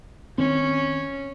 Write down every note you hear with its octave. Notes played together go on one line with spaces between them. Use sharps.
D#3 C4 C#4